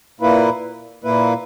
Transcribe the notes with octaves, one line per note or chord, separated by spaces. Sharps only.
A#2 A#3 E4 B4
A#2 A#3 E4 B4